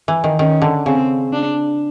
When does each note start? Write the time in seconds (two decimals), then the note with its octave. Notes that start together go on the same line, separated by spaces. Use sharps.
0.08 E3
0.24 D#3
0.39 D#3 C#4
0.62 D3
0.86 C#3 C4
1.32 D4